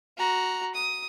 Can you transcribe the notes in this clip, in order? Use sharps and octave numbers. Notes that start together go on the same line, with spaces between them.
F#4 A#5
D#6